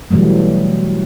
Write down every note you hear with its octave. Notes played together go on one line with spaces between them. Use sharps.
B2 E3 F#3 G3 A3